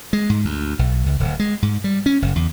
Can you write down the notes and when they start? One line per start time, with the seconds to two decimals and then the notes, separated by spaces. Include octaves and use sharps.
0.13 G#3
0.30 G#2
0.45 D2
0.79 B1
1.06 C#2
1.20 D1
1.39 G#3
1.62 G#2
1.84 G3
2.06 C#4
2.22 F#1
2.36 E2